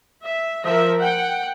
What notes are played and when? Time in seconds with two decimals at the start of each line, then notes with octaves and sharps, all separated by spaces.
0.24 E5
0.64 F3 A#4 E5
1.02 F#5 G5